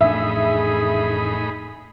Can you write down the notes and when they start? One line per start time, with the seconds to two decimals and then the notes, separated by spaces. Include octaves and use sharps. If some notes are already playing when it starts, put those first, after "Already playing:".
0.01 A1 F2 A2 D4 D#4 G#4 E5 B5